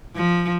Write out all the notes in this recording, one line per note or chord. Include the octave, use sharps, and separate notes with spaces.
F3